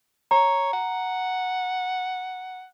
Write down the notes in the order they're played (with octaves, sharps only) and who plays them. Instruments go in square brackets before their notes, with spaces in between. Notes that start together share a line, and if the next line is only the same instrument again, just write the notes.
[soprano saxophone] C#5 [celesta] A#5
[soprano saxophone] F#5